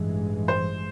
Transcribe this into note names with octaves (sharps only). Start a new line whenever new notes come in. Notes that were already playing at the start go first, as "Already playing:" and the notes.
Already playing: A1 G2 E3 G#3
C5